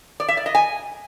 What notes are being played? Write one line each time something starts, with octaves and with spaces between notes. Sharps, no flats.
D5
E5
D5
D#5
G#5